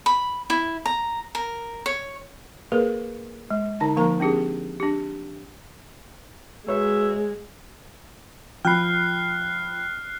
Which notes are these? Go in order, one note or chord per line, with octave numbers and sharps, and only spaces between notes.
B5
E4
A#5
A#4
C#5
A#3 G#4 A#4 B4
G#3
D3 D#4 A5
F3 A#3 A#4 A#5
C4 D4 G4 G#4
D4 G4
G#3 F#4 B4 C#5 E5
F3 G5 B5 F6 F#6 C7